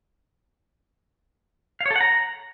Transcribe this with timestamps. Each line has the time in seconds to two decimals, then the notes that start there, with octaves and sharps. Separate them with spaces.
1.81 F5
1.86 C#5
1.91 A4
1.96 F#5
2.01 A#5